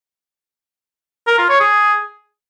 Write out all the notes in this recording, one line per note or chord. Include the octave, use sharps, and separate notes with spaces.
A#4
F4
C#5
G#4